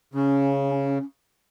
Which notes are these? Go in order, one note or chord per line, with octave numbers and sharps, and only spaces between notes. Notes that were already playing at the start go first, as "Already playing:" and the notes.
C#3 C#4